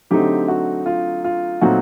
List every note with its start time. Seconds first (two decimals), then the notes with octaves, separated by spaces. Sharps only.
0.11 D3 F#3 A3 C4 D#4 G4
0.48 F#4
0.86 F4
1.24 F4
1.61 A#2 F#3 A3 C4 D#4 F#4